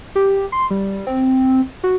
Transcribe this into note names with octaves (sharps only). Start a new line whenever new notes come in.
G4
C6
G3
C4
F#4